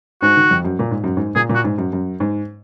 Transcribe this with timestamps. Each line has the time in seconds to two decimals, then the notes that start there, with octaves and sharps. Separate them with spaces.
0.22 G#2 F#4
0.36 D#3
0.51 F2
0.65 F#2
0.79 A#2
0.91 G#2
1.04 F#2
1.17 G#2
1.35 A#2 G#4
1.49 A#2
1.55 F#4
1.64 G#2
1.78 F#2
1.93 F#2
2.20 G#2